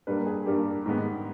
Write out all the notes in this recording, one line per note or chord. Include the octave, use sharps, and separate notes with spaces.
G2 G3 A#3 B4
G#4
G2 G3 A#3 G4
G#2 D#3 G#3 B3